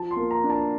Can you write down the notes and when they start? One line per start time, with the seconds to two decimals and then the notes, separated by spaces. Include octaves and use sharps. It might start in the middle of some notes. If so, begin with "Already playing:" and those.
Already playing: F3 A5
0.11 C6
0.16 A#3
0.31 A#5
0.44 D4
0.50 A5